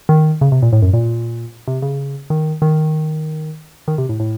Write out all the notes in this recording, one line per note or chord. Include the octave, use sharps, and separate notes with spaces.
D#3
C#3
C3
A#2
A2
F#2
A#2
C3
C#3
D#3
D#3
D#3
C3
A2
A2